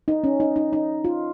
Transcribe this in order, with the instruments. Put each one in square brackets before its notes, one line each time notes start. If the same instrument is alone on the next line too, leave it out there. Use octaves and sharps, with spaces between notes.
[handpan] D#4
C#4
D#4
D#4
D#4
F4